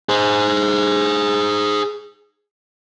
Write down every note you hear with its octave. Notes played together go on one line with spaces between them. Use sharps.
G#4 C5